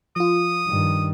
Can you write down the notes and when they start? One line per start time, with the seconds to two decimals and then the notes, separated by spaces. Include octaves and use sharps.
0.16 F3 F4 D#6
0.67 G2 D#3